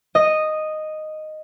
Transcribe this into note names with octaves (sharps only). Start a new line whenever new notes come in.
D#5